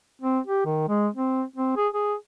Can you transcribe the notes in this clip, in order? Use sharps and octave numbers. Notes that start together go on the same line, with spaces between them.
C4
G4
D#3
G#3
C4
C4
G#4
G#4